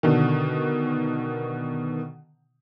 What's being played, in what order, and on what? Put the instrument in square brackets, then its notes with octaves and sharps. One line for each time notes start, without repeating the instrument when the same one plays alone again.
[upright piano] B2 D3 D#3